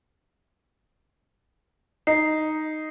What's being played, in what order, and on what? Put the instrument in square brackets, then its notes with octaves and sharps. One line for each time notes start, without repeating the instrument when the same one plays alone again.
[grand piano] D#4 [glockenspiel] C7